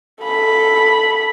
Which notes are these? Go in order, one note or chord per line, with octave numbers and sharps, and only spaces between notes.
A4 B5